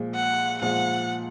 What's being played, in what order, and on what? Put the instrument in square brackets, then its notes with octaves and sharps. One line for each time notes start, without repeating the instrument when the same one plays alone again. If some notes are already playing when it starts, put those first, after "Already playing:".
Already playing: [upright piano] A#2 F3 G#3
[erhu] F#5
[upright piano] A#2 F3 G#3 [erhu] F#5